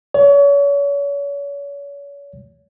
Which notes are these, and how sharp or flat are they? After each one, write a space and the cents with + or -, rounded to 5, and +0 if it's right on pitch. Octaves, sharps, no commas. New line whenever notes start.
C#5 +35